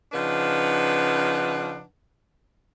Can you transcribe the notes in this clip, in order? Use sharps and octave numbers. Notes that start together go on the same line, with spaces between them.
C#3 F3 D4 D#4 B4 F#5